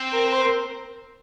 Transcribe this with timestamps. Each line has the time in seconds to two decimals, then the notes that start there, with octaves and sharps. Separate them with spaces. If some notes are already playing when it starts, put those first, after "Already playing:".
Already playing: C4
0.12 A#4
0.26 A#4
0.32 C5
0.42 A#4